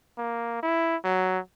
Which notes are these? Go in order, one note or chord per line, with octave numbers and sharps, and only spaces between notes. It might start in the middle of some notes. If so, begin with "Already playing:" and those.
A#3
E4
F#3